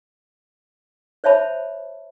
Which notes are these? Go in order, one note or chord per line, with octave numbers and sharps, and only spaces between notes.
C5 C#5 E5 A5 B5